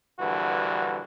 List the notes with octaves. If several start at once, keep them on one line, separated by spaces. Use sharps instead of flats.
A#1 G2 D3 E3 F#4